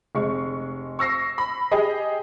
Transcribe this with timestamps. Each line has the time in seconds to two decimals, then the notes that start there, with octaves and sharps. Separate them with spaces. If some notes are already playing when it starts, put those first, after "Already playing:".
0.15 F1 G#3 C#6
0.99 C#6 E6 A#6 C7
1.38 B5
1.72 G4 G#4 D#5